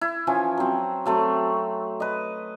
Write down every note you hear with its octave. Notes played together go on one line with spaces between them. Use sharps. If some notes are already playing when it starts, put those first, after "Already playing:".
E4
E3 F3 C#4
F#3 C4
F#3 A3 C4
B4 D#5